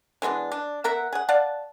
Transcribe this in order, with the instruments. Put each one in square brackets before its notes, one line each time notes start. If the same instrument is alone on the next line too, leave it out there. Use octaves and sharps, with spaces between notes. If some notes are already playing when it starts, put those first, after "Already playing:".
[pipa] E3 G#3 B3 D4
D4
B3 A#4 E5 F#5
G#4 F#5
D5 F5 F#5 A5